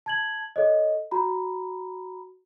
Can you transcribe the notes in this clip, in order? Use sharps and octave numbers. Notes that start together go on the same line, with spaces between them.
A5 G#6 F#7
A4 C#5 D#5
F#4 A#5 B5